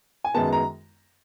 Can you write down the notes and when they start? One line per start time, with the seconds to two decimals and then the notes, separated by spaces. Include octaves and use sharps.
0.24 G#5
0.35 F#2 D#3 G#3 B3 A5
0.53 A#5